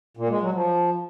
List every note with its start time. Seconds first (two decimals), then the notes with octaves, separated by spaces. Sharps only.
0.17 A#2
0.29 G#3
0.41 F#3
0.53 F3